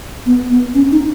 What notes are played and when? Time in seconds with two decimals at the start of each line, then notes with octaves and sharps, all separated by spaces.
0.26 B3
0.50 B3
0.74 C#4
0.92 D#4